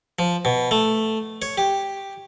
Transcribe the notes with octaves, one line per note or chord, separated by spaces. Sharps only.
F3
B2
A3
C#5
G4